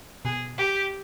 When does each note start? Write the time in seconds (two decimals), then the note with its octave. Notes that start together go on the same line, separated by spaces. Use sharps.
0.25 B2 G#4
0.58 G4